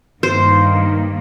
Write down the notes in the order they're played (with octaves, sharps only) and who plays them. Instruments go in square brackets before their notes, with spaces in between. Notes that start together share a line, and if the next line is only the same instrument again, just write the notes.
[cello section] G2 D#3 A#3 [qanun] C5